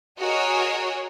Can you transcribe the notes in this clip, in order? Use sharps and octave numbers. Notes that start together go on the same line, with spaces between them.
F#4 G#4 A#4 C#5 D#5